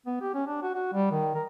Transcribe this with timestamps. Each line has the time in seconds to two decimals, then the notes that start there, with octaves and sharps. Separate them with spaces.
0.06 B3
0.21 G4
0.34 C#4
0.47 D4
0.62 F#4
0.74 F#4
0.94 G3
1.11 D#3
1.35 A#4